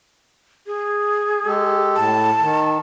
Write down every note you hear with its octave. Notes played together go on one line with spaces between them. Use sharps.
G#4
G#3 G4 A4
A2 A5
D#3